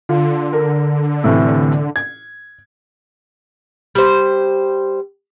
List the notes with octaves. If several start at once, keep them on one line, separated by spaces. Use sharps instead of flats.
D3 F4
A#4
A2 C3 E3
G#6
G3 C5